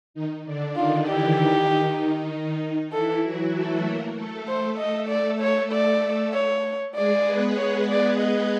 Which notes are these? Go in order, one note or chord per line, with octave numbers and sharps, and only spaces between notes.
D#3 D#4
D3 D4
D#3 D#4 F4
E3 E4 G4
D#3 D#4
D#3 D#4
E3 E4 A4
F#3 F#4
A3 A4
A#3 A#4
A3 A4
C5
D#5
A3 A4 D5
C#5
D5
C#5
G#3 G#4 D5
B3 B4
C#5
D5
D#5